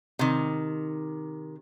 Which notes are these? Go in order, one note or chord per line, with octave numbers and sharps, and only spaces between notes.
C3 D#3